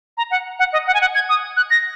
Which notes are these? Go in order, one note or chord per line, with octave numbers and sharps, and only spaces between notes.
A#5
F#5
F#5
D#5
F#5
G#5
F#5
G#6
D#6
F#6
A#6